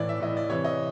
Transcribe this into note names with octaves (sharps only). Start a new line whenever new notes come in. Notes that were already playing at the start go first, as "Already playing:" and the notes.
Already playing: A2 E3 D5
E5
A2 E3 D#5
D5
C3 E3 C#5
D#5